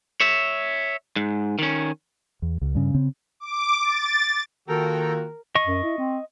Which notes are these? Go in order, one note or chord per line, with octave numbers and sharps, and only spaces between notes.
C#5 E5
G#2
D#3 C#4
E2
C#2
G2 C#3
C#3 C4
D6
A6
D#3 A#3 F4 F#4 A4 A#4 G5 A#5
D#5 C#6
F#2
E4
C4